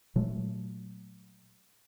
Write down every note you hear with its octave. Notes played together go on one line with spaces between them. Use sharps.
A#2 F#3 G#3 A3